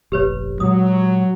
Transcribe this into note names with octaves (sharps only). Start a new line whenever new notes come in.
F1 A#1 G4 B4 C#5
A#2 F#3 G#3 D#6